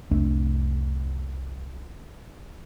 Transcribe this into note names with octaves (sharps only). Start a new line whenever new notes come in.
C2 F2 A3 D4